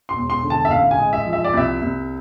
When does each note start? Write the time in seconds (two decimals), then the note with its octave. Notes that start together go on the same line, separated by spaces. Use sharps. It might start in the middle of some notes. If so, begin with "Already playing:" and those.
0.09 C6
0.16 E1
0.30 C6
0.43 D3
0.50 A5
0.65 E5
0.70 A1 F5
0.91 G#5
0.98 G#3
1.13 E5
1.26 F3
1.33 E5
1.44 D5
1.53 C2 E5
1.82 C2